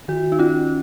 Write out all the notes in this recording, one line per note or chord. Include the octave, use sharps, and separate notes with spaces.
D#3 F#4
D#4
C#4 F4